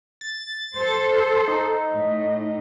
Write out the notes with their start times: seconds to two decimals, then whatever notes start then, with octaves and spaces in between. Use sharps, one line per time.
0.21 A6
0.75 A4 C5
1.48 D#4
1.93 A2